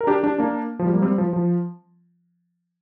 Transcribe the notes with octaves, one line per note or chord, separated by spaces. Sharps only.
A#4
D4 G4
D4 G4
A#3 D4
F3
G3
A#3
G3 C4
F3
F3